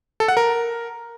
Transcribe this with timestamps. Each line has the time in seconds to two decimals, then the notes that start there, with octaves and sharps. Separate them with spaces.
0.20 A4
0.28 F#5
0.37 A#4